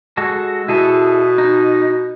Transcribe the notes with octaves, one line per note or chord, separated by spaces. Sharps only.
G#3 F#4 A4
B2 E4 G#4 A4
D#4